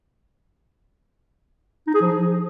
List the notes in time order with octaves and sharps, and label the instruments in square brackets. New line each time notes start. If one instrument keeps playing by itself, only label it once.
[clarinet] D#4
G#4
F3